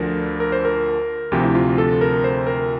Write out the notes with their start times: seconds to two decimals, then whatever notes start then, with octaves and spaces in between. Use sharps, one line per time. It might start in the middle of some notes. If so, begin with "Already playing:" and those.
Already playing: D2 D3 F3 A#4
0.40 A#4
0.52 C5
0.65 A#4
1.32 D2 C3 F3 G4
1.44 E4
1.55 F4
1.78 A4
2.01 A#4
2.24 C5
2.47 A#4